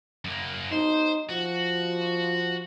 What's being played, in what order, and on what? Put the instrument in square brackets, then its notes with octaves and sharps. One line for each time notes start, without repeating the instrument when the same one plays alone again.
[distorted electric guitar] F#2 A#3
[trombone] D#4 [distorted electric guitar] C5
[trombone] F3 [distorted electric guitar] F#4